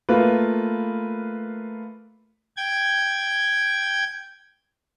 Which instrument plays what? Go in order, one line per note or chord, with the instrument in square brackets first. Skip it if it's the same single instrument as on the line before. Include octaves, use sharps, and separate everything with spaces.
[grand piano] A3 A#3 F4 B4
[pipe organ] G5 G#6